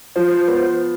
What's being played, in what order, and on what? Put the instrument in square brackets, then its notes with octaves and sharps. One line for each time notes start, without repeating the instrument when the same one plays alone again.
[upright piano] F3 [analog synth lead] C5
[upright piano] B3